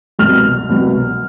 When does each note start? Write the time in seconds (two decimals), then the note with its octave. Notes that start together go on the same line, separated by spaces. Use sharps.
0.19 C2 B2 F#3 F6
0.69 C2 B2 F#3